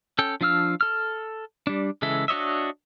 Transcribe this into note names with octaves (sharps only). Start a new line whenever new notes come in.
C#4 A4 G5
F3 D4 F5 E6 F6
A4 F6
G3 D4
C#3 E3 G#3 A4 E5
D4 F#4 C#5 D#5 E5